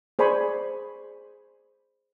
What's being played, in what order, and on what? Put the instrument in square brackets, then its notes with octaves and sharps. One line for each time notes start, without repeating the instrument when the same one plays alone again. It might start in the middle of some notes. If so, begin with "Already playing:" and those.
[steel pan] G#4 C5 D5 G#5 B5 C#6